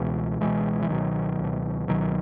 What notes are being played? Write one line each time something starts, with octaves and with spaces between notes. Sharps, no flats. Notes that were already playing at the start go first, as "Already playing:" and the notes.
Already playing: C#2 B2 E3 G#3
C#2 B2 E3 G#3
E3
C#2 B2 D#3 F#3
C#2 B2
C#2 B2 D#3 F#3